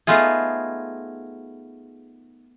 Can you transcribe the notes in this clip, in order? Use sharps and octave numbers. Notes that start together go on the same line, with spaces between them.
A3 B3 D#4 F4 G#4